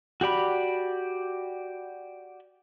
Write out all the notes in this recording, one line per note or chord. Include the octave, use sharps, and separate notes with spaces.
F#4 G4 D5 B5